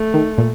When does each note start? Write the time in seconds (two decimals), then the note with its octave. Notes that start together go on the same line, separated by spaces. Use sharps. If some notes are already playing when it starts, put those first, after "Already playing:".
Already playing: A3
0.14 D#3
0.38 A#2